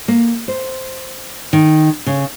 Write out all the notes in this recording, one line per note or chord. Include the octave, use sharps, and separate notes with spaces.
A#3
C5
D#3
C#3